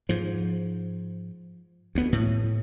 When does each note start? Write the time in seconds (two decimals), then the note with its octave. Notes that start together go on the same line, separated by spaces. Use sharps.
0.09 G#2 F3
1.95 D2 B3
2.13 A2